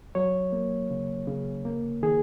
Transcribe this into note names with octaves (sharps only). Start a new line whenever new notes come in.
F#3 C#5
A#3
C#3
C#3
A#3
D#3 G#4